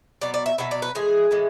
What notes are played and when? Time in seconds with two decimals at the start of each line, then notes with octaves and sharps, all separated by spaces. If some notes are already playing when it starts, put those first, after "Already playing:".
0.21 B2 F#3 B3 D5
0.34 D5
0.46 E5
0.58 B2 F#3 B3 E5
0.71 D5
0.82 B4
0.95 A2 E3 G#3 G#4
1.31 A2 E3 G#3